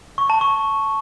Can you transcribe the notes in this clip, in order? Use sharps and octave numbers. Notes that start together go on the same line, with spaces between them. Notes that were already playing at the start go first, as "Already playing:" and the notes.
C#6
A5
C#6